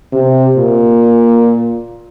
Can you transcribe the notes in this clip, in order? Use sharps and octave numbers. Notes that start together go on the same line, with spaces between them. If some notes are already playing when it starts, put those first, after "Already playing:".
C3
A#2